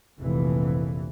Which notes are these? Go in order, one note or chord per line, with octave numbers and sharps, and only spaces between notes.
F1 A#1 E3